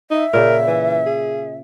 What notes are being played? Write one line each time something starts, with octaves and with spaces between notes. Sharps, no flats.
D#4 E5
A#2 C#3 A#4
E3
G#4